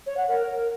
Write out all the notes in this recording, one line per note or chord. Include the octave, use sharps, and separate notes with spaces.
C#5
F#5
A#4